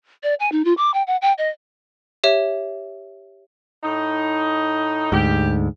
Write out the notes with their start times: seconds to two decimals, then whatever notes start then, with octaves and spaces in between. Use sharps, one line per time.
0.23 D5
0.40 G#5
0.52 D#4
0.65 F4
0.77 D6
0.94 G5
1.07 F#5
1.22 G5
1.38 D#5
2.24 G4 C#5 E5
3.84 A2 D#4
5.12 D2 G#2 G4